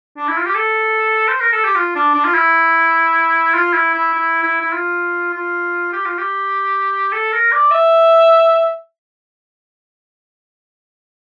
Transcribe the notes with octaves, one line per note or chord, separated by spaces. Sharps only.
D4
E4
F4
G4
A4
C5
A#4
A4
G4
F4
D4
D4
F4
E4
F4
E4
E4
E4
E4
E4
F4
F4
G4
F4
G4
A4
A#4
D5
E5